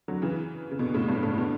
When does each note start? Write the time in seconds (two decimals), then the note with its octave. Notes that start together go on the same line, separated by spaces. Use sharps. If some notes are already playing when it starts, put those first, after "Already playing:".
0.08 D3 F#3
0.22 C#3 E3
0.71 C#3
0.79 B2 D3
0.94 A2 C#3
1.08 G2 B2
1.23 A2 C#3
1.38 B2 D3